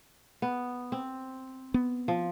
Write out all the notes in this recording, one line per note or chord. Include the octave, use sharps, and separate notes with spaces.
B3
C4
B3
F3